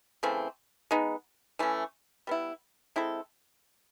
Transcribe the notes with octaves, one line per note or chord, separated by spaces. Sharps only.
C#3 E3 A3 C4
G#3 B3 D#4
E3 A3 C#4
G3 B3 E4
G#3 C4 E4 A4